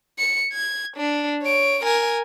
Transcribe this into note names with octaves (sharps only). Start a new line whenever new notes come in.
C#7
G#6
D4
C#5 D7
A#4 G#5